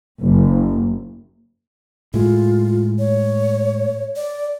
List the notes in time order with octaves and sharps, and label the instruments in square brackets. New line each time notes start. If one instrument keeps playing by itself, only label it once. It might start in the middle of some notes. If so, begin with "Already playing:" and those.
[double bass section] F#1
[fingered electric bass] A2 G#3 [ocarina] F4
[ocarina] C#5
D5